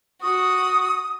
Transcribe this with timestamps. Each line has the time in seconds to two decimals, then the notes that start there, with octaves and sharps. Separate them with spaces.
0.22 F#4 D#6